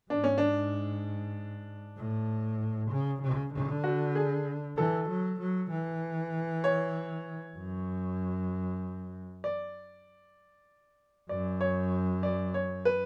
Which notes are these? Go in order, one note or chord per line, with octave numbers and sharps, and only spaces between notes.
G#2 D4
C#4
D4
A2
C#3
C#3
D3
F#4
G#4
E3 A4
F#3
F#3
E3
C#5
F#2
D5
F#2 D5
C#5
D5
C#5
B4